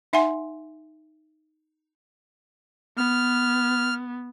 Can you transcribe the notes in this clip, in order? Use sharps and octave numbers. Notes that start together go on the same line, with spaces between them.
D#4 E5 F#5 G#5 C6
B3 F6